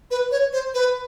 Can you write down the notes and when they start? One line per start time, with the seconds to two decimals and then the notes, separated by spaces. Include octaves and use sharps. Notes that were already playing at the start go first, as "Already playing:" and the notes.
0.11 B4
0.31 C#5
0.53 C5
0.74 B4